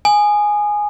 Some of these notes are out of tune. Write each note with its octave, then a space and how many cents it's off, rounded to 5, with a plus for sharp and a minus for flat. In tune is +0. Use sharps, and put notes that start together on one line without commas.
G#5 +0 D#6 -30